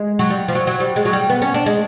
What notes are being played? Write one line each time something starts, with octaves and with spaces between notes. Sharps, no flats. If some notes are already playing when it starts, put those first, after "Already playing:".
Already playing: G#3
F#3
G3
F3
F#3
F#3
G3
G#3
F#3
G3
B3
C#4
D4
G#3